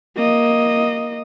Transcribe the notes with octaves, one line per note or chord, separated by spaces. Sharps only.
A#3 D#5